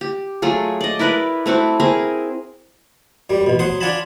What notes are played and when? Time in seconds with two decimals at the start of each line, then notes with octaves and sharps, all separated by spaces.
0.01 G4
0.42 F#3 A3 F4 G#4
0.81 D5 D#5
0.99 E4 A#4 B4 D5
1.46 A3 C4 E4 F#4
1.80 C4 G#4 A#4
3.30 F#2 G3
3.46 A1 B2
3.59 F#3 C5 F#5 C6 D#6
3.80 D4 F4 F#5 G#5 A5 B5